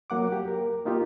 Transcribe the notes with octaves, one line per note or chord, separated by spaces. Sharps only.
F#3 A#3 F#5 D6
G4
A#4
A#3 D#4 F4 G4